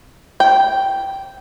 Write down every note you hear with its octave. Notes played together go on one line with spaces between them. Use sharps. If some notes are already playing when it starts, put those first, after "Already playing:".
G5